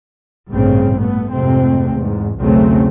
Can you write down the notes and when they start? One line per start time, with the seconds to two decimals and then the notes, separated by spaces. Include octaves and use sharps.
0.50 A1 G2 A#2 C#3 C4
0.98 A3 B3
1.31 F2 G#2 C3 A3 C4
1.93 E2 G#2
2.39 B1 E2 C#3 F#3 A3 C4